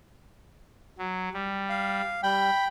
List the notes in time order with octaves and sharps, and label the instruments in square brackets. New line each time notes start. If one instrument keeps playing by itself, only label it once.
[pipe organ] F#3
G3
[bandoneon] F5
[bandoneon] G3 [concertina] G5 [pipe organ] B5